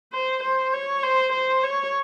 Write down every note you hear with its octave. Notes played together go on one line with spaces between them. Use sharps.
C5
C5
C#5
C5
C5
C#5